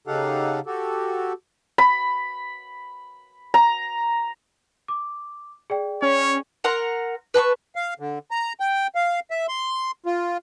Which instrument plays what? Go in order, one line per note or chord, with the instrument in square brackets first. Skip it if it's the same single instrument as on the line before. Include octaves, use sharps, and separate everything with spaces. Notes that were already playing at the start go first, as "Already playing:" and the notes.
[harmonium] C#3 D#4 G4 A4 F5 F#5
F#4 G4 A4
[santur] B5
A#5
[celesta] D6
G#4 D5 G5
[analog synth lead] C#4 [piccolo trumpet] C#5
[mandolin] A#4 F#5 A#5 C6
B4 A5 C6 C#6
[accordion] F5
D3
A#5
G5
F5
E5
C6
F4